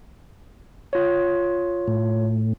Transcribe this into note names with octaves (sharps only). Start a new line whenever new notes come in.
F4 C#5
A2